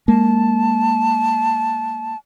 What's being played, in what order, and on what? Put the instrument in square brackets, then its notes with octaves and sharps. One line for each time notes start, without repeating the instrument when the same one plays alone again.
[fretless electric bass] G#3 A#3 [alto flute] A5